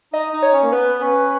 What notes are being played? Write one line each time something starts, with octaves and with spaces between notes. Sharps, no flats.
D#4 D#5
D#4
C#5
C#4
A#3
B3 B4
C#4